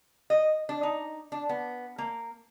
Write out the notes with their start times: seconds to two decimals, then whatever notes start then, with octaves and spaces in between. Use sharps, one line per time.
0.30 D#5
0.69 D4
0.83 D#4
1.32 D4
1.49 B3
1.98 A#3